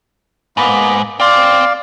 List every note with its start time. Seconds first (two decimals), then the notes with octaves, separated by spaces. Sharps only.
0.57 G#2 A#3 B3 B5
1.20 C4 D5 F5 C6